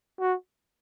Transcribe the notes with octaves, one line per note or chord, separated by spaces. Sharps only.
F#4